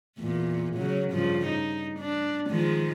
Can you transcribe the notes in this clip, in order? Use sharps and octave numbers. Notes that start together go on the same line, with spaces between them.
E2 A#2
C#3 F#3
G2 C#3 F3
D#4
D4
D#3 F3 G#3